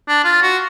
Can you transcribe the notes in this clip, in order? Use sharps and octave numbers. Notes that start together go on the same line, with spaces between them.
D4
F4
F#4